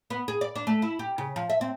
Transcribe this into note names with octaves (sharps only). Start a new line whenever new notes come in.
B3
G#4
D5
D4
A3
E4
G4
C#3
F3
E5
C4